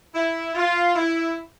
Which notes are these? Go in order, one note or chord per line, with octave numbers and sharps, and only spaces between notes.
E4
F4
E4